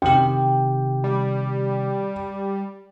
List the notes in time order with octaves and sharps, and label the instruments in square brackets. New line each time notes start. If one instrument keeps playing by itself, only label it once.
[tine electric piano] C3 D#3 G4 [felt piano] G5
[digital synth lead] G3